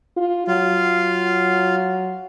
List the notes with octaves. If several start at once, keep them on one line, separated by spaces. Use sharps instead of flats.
F4
F#3 F4 F5